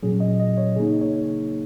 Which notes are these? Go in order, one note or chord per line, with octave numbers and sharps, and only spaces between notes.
A#2 F#3 C#4 G#4
D#5
D#5
C#5
C#3 A#3 D#4 G#4
C#5